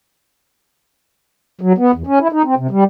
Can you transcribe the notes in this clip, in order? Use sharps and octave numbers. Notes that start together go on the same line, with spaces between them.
F#3
B3
E2
C#4
E4
D#4
C4
C3
G3